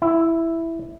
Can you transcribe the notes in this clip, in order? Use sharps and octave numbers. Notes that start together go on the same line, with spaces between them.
E4